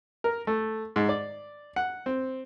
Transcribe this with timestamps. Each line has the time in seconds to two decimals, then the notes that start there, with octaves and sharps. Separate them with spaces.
0.24 A#4
0.47 A3
0.96 G#2
1.09 D5
1.76 F#5
2.06 C4